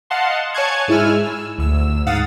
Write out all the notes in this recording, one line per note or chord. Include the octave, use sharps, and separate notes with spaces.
D#5 F5 F#5 A5 C6
C#5 G#5 A5 C#6 F#6 G#6
G#2 G#3 E4 G#5 E6 F6
E6
D2 E6
G#2 F5 F#5 D#6 A6